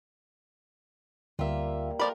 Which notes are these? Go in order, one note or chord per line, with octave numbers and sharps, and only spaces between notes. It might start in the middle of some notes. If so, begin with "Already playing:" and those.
D2 G3 A#3 F4 E5
F3 A3 F4 A#4 D5 B5